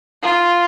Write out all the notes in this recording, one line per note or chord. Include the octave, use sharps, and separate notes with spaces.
F4